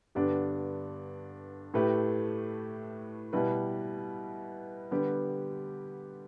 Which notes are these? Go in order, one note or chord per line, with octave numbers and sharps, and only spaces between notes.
G2 D3 B3 D4 G4
A2 A3 G4 B4
B2 G3 E4 B4
D3 G3 B3 G4 B4